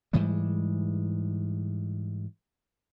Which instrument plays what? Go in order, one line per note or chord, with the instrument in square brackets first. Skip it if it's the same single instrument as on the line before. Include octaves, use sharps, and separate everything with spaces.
[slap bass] G#2 E3 G3 G#3